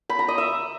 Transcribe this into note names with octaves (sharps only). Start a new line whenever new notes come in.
B5
A#5
D#5
E5